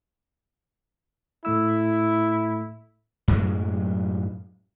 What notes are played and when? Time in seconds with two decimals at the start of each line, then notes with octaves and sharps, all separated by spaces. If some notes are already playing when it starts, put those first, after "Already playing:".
1.45 A2 A3 E4 E6
3.28 F#2 A2 F#3 G#3